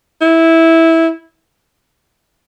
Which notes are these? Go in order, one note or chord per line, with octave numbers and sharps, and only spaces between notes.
E4